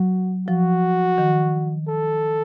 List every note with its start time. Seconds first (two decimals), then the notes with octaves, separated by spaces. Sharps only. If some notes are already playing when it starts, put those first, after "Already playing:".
Already playing: F#3 F#4
0.48 F3 F#4
1.18 D#3
1.89 A4